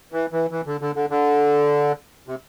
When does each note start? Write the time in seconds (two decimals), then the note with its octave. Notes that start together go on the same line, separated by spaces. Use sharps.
0.12 E3
0.33 E3
0.51 E3
0.66 D3
0.81 D3
0.95 D3
1.10 D3
2.28 C3